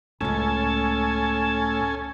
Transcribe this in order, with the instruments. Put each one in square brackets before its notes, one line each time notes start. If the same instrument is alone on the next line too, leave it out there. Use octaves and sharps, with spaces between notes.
[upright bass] C#2 G#3 [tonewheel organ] A2 A3 [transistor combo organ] C#4 A4 G#5